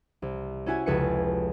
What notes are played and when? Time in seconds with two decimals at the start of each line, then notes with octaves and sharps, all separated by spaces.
0.22 C2
0.66 C#4 E4 F#4 G#5
0.86 F1 C#2 A4 B4 G#5 C#7